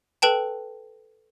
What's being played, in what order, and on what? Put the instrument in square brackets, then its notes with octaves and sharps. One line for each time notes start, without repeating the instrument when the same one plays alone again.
[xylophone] A4 B4 G5 A5